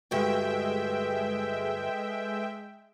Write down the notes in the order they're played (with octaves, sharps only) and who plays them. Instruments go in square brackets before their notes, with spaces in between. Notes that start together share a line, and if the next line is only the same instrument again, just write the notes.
[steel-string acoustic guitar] D2 G2 [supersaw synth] G#3 E5 G5 [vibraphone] A4 B4